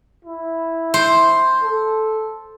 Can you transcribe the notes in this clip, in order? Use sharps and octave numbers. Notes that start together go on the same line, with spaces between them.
E4
C5
A4